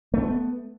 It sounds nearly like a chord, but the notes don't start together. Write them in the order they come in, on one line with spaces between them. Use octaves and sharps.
A3 C4 B3